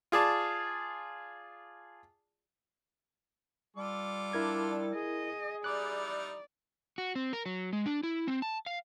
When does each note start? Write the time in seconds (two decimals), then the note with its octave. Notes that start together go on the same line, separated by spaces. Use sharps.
0.12 F4 G#4 D5 A5
3.77 G3 F4 A4 D6
4.33 D4 E4 A#4 G#6
4.95 G#4 D#5
5.64 G3 D#4 E4 D5 D6 F#6
6.98 F#4
7.16 C4
7.33 A#4
7.46 F#3
7.73 G#3
7.86 D4
8.03 E4
8.27 C4
8.42 A5
8.66 F5